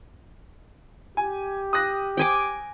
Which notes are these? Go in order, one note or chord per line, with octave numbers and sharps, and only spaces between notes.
G4 G#5
D#6 F#6 A#6
G5 G#5 D6